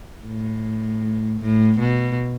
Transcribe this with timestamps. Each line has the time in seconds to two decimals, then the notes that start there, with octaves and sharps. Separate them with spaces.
0.24 A2
1.41 A2
1.80 B2